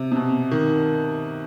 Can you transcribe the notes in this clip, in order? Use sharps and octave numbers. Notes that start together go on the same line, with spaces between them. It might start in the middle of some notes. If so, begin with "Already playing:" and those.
Already playing: C3
C3
B2
D#3